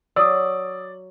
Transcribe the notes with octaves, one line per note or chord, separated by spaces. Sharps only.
F#3 D5 D#6 E6